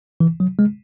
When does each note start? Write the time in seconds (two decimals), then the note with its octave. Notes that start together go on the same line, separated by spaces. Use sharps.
0.20 E3
0.40 F#3
0.59 G#3